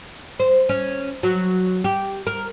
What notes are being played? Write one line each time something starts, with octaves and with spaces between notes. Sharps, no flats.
C5
C#4
F#3
G4
A#4